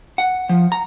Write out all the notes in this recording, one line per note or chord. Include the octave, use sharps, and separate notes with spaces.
F#5
F3
A#5